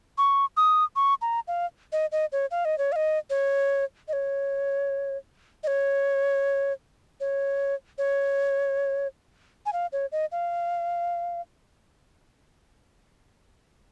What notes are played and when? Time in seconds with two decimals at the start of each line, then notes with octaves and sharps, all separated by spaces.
0.18 C#6
0.57 D#6
0.96 C#6
1.22 A#5
1.48 F5
1.92 D#5
2.12 D#5
2.32 C#5
2.51 F5
2.65 D#5
2.78 C#5
2.92 F5
2.96 D#5
3.30 C#5
4.08 D#5
4.13 C#5
5.63 D#5
5.67 C#5
7.20 C#5
7.98 C#5
9.66 G#5
9.73 F5
9.92 C#5
10.12 D#5
10.32 F5